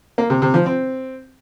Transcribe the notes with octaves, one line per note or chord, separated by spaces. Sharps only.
A#3
C3
C3
F3
C4